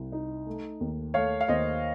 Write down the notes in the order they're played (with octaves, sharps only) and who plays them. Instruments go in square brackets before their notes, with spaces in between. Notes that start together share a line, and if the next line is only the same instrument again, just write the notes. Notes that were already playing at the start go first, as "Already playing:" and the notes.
Already playing: [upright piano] C2
D#4
A3
D#2
[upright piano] A3 [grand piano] C#5 F5
[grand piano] F5
[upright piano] D#2 [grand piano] C5 D#5